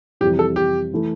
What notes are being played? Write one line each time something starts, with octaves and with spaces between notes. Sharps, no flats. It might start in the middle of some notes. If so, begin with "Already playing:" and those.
F2 C3 E3 G3 G4
A4
G4
E3 A3